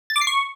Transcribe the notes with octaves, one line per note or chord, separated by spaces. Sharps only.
A6
D6
C7
C#6